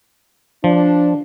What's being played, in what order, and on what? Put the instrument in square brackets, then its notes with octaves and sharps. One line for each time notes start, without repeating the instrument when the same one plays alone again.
[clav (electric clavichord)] F3 [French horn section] D4